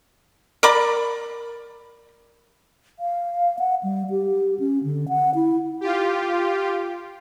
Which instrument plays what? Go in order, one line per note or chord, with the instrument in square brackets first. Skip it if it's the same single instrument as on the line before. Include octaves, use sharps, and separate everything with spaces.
[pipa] A#4 D5 B5
[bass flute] F5
F#5
G3
G4
C#4
D3
F#5
E4
[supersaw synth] F4 G4